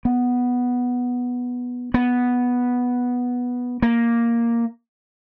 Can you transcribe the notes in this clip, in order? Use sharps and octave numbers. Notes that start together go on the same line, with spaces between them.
B3
B3
A#3